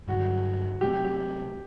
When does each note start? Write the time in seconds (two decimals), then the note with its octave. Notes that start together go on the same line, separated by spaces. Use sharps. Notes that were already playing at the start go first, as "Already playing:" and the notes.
0.08 G2 D3 F#3 F#4
0.81 C3 F#3 A3 C4 G4
1.05 G4